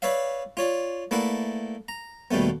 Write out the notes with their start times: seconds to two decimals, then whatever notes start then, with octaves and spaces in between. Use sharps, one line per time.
0.02 B4 C#5 D5 E5 F5
0.57 F4 C#5 D5
1.11 A3 A#3 E4 B4 D5 F#5
1.88 A#5
2.31 D#2 B2 G3 A3 B3